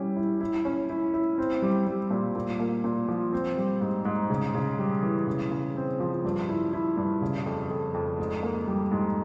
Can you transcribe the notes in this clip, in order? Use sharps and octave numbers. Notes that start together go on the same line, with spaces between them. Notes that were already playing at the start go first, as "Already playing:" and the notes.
Already playing: G3 C#4 E4
E4
E4
C#4
E4
E4
C4
G3
G3
A#2
A#2
A#3
A#2
F3
C4
G3
G#2
G#2
C#3
C#3
G3
E3
C#3
C#3
C4
F3
G2
E4
E4
G2
C#3
F2
F2
F2
G#2
A#3
G3
G#2